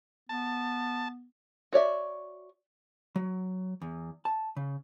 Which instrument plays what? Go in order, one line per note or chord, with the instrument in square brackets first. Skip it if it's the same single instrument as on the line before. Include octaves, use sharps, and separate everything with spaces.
[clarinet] B3 [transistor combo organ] A5
[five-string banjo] F#4 C#5 D5 E5
[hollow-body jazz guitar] F#3
E2
A5
C#3